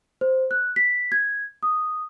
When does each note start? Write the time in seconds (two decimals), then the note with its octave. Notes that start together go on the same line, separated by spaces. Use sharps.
0.21 C5
0.51 F#6
0.76 B6
1.12 G#6
1.63 D#6